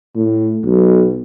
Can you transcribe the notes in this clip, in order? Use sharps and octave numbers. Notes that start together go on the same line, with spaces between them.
A2
B1